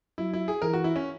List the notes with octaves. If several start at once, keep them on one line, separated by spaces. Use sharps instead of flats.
F#3 E4
E4
G#4
E3 A#4
F#4
E4
C#4